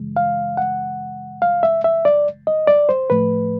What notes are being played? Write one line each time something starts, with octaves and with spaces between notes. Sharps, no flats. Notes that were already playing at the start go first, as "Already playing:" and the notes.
Already playing: F#2 C#3 E3 G#3
F5
F#5
F5
E5
E5
D5
D#5
D5
C5
A2 F3 A3 B4